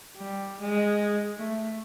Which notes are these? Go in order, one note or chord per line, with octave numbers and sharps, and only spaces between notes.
G3
G#3
A3